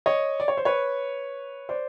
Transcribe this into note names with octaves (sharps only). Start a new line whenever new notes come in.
C#5 D#5
D5
C#5
C5
B4 C#5
C5 D5